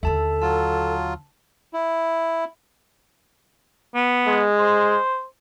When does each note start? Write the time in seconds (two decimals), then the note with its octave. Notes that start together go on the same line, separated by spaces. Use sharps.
0.03 D#2 D3 A4 E5 A5
0.42 F#3 F4 A5
1.73 E4
3.95 B3
4.27 G#3
4.59 C5